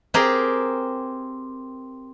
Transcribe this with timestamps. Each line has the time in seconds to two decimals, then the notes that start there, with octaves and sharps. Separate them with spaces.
0.14 C4 G4 G#4 A#4 C5